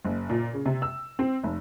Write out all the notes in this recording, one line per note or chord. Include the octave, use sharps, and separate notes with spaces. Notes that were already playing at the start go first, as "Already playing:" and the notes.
F#1
A#2
C#3
C3
E6
C4
F1